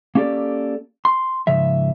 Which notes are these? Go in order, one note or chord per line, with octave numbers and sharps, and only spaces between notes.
A#3 C#4 G4 A4 D5
C6
G#2 C#3 F3 E5